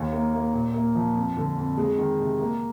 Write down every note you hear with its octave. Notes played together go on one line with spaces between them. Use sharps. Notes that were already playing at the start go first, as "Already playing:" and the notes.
Already playing: D#2
A#3
A#3
A#2
A#3
F3
F2
D3
F2
G#3
D#3
C3
A#3